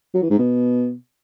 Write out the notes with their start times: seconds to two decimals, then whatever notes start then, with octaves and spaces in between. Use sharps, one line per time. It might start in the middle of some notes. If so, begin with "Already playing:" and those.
0.14 F#3
0.22 E3
0.30 G#2
0.38 B2